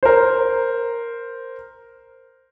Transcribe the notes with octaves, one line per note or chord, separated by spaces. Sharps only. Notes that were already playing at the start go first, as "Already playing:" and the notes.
A#4 C5